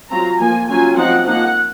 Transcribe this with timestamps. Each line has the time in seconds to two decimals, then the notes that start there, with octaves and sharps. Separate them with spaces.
0.11 F#3 C4 F4 A#5
0.40 F3 A#3 F4 G#5
0.69 F#3 C#4 F4 G#5
0.97 F3 C4 D#4 F#5
1.26 F3 A#3 D#4 F#5